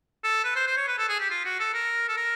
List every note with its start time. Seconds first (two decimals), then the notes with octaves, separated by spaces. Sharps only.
0.24 A4
0.44 B4
0.56 C5
0.67 C5
0.77 C#5
0.88 B4
0.98 A4
1.09 G#4
1.20 G4
1.30 F4
1.45 F#4
1.60 A4
1.74 A#4
2.09 A4
2.17 A#4